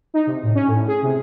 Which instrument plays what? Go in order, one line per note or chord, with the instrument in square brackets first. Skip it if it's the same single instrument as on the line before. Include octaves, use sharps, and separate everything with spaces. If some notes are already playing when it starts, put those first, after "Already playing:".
[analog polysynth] D#4
C3
A2
C#4
A2
G#4
C3